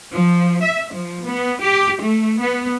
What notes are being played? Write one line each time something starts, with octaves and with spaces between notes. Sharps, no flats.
F3
E5
F3
B3
G4
A3
B3